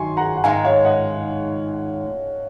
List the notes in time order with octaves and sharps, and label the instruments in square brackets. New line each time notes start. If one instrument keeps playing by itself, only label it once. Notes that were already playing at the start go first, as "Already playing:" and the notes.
Already playing: [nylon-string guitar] D#3 F#3 [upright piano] G#5 C6 C#6
[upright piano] F#5 A#5
F#5
[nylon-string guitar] G#2 D#3 G#3 D#4 [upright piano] F5 G#5
[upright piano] C#5 F5
D#5 F#5